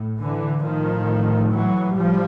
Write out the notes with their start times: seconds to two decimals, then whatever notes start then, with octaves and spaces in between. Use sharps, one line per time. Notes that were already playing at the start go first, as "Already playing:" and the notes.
Already playing: A2
0.21 D3 E3
0.64 A2 D#3 F3
1.51 E3 F#3
1.95 F3 G3